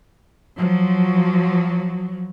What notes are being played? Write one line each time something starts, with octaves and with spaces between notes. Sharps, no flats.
F3 F#3